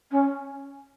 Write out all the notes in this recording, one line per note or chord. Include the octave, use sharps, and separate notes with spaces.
C#4